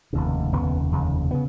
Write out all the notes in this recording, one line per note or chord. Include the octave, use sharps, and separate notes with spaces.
F1 D#2 C#3
F1 D#2 C#3 B3
F1 D#2 C#3
C#3 B3